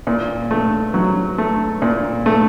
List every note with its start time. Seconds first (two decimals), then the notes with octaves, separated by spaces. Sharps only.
0.07 A#2
0.51 A3
0.94 F#3
1.38 A3
1.82 A#2
2.26 A3